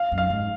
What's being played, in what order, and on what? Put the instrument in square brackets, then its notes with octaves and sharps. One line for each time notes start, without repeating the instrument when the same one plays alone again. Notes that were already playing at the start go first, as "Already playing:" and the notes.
Already playing: [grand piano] F5
[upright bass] F#2
[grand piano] F5
[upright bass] G#2